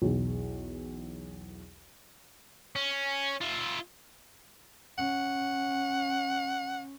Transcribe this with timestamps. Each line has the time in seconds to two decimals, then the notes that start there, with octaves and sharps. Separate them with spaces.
0.02 B1 E2
2.76 C#4
3.41 F4 E5
4.98 C#4 F#5